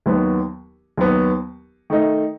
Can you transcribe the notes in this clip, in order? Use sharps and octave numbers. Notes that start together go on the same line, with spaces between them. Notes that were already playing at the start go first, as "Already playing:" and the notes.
D#2 D#3 F#3 B3
D#2 D#3 F#3 B3
D#3 A3 D#4